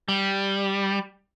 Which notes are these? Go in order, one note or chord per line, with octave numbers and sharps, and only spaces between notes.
G3